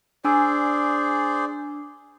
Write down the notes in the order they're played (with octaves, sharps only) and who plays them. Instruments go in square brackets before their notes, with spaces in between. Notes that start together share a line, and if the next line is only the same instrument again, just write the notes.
[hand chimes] D4 G#5 E6 [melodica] G#4 C5 D5